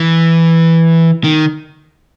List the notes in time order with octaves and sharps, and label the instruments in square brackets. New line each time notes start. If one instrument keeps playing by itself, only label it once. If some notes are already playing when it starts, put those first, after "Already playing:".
Already playing: [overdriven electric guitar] E3
D#3